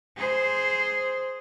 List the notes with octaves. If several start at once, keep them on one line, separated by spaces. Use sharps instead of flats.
G#4 C5